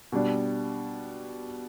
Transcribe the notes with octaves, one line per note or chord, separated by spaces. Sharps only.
B2 G3 D4